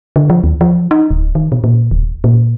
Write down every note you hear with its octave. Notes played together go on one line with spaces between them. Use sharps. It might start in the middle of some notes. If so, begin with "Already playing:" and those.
D3
F3
D#2
F3
D#4
D1
D#3
B2
A#2
D#1
A#2